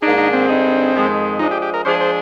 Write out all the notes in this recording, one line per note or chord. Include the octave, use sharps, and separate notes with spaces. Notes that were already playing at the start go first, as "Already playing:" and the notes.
G#2 D#3 A#3 D4 D#4 G#4
D#4
C4
G2 D3 G#3 D#4 G#4
F2 D#3 G#3
F3 G#3 D4 D#4
G4
G4
A#4
F3 G#3 D4 G#4 C5
C5